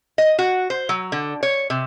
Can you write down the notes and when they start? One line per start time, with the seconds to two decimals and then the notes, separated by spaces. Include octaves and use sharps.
0.18 D#5
0.39 F#4
0.70 C5
0.89 F#3
1.12 D3
1.43 C#5
1.70 C3